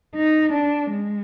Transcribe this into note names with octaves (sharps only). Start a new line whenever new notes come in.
D#4
D4
G#3